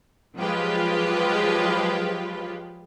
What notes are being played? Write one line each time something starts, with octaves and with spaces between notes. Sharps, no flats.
F3 F#3 G#3 F4 G4 B4